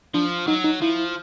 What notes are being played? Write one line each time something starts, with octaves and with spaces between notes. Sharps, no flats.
F3 D4
F#3 D#4
D#4
F3 E4